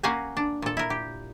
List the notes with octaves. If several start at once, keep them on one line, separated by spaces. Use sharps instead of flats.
A#3 C#4 F#4 F5 G#5 A#5
D4
A#2 A4
E4 A#4
G4